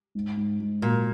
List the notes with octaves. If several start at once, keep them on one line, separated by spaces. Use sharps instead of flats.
G#2
G#2
G#2
A#2 F#3